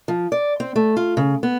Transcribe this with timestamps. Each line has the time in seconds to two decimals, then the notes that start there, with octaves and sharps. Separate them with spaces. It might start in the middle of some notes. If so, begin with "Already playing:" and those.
0.08 F3
0.32 D5
0.60 C4
0.76 A3
0.97 F4
1.17 C#3
1.43 B3